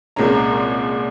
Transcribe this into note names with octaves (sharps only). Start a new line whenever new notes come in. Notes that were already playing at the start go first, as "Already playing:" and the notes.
C2 A#2 G#3 C#4 A#5